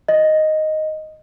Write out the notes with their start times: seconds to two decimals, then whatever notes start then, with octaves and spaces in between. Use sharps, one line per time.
0.08 D#5